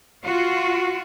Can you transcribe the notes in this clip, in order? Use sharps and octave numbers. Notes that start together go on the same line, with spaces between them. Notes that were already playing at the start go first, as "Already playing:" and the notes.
F4 F#4